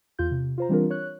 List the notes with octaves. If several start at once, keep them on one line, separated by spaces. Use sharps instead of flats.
E2 F4 G6
C3
F4 C5 A#5
E3 G3 C4 D4 F4 A#4
C#5 F#6